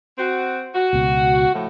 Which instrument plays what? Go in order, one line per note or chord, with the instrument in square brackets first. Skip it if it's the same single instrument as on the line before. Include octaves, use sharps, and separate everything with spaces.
[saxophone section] C4 F#4
F#4
[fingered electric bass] C#2 B2
[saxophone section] A2 F3